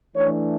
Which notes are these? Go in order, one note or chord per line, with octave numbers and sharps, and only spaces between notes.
E3 A3 D4 C#5